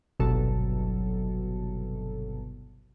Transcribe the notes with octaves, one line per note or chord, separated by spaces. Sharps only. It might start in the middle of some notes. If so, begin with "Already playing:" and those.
G1 C2 B2 F#3 A4